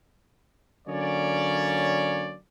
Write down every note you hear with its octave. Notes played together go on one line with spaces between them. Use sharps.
D3 F#3 A#3 C#4 C#5 D5